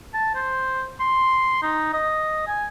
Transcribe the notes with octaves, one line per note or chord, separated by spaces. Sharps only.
A5
C5
C6
D#4
D#5
G#5